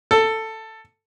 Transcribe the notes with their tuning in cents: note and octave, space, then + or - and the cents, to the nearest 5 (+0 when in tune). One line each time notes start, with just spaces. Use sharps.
A4 +10